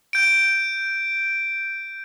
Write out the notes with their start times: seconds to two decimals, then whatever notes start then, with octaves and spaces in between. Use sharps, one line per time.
0.13 G6 D7